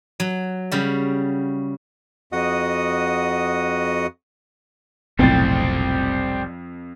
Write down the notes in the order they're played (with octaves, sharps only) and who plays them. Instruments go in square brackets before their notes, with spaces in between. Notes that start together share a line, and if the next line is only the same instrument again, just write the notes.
[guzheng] F#3
C#3 G3 F#4
[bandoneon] F2 F#4 D#5 F#5 D#6
[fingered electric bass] F1 B1 A2 [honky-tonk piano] F2 G5 A6 [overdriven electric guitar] G3 C4